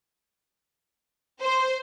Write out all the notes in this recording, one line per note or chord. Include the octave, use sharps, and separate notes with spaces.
C5